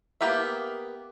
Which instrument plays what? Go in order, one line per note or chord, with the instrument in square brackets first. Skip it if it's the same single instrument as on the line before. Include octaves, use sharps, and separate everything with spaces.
[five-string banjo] A#3 B3 G4 A#4 E5